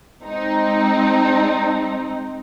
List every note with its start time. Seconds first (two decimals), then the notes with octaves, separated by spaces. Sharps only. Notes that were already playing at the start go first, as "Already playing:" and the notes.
0.23 G#3 C4 D#4